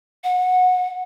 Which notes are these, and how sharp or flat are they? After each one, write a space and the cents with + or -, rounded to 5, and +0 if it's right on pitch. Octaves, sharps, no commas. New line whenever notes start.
F#5 -20